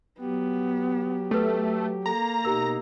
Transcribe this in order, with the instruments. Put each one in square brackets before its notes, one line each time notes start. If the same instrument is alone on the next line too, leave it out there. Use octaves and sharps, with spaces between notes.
[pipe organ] F#3 G4 [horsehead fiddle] B3
[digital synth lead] A3 [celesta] A4 B4
[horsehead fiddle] A#3 [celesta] A4 [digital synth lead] A#5
[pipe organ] B2 D#4 [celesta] G4 A#4 E6